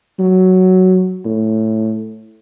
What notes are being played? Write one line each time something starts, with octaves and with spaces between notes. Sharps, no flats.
F#3
A2